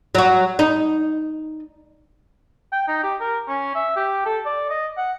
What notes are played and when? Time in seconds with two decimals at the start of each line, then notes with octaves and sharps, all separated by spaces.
0.15 F#3 F#4
0.59 D#4
2.72 G5
2.88 D#4
3.03 G4
3.20 A#4
3.48 C#4
3.75 E5
3.96 G4
4.25 A4
4.46 D5
4.70 D#5
4.97 F#5